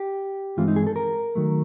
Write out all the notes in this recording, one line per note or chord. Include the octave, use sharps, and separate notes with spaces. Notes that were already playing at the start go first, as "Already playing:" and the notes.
Already playing: G4
G2 E3 G#3 C4 F4
D#4
G#4
A4
A#4
D#3 F#3 A3